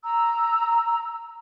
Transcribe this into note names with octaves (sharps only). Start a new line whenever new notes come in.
A#5 E6